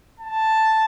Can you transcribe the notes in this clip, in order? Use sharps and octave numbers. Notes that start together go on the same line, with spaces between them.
A5